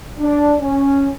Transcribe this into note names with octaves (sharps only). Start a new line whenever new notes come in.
D4
C#4